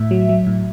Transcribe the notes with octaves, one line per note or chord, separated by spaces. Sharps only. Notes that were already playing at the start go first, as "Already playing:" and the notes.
Already playing: A2 E5
F#3
F#3
A2